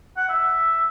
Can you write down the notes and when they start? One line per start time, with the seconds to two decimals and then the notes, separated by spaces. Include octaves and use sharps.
0.17 F#5
0.29 E5